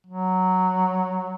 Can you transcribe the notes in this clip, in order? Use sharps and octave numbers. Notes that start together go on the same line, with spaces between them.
F#3